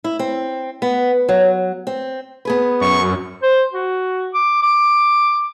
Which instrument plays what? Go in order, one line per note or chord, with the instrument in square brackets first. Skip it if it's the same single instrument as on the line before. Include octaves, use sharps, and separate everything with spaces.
[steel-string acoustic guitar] E4
C4
B3
F#3
C4
[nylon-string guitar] B3 G#4 B4
[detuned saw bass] F#2 [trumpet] C#6
[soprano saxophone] C5
F#4
D6
D6